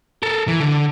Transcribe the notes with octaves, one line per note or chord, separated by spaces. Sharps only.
A4 A#4
E3
D3